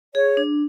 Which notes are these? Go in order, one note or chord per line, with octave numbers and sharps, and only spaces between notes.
G#4 C#5
D4